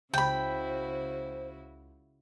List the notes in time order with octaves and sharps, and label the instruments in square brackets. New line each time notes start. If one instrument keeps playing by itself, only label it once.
[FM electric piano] C#2 [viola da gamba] C#3 E4 F#4 [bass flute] C5 [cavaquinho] G5 B5